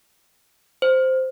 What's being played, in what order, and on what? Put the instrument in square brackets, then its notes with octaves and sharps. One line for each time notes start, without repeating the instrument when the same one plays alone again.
[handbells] C5